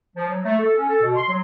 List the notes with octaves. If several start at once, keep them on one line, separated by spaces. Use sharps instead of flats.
F3
F#3
A3
A4
C#4
A4
B2
C6
F#3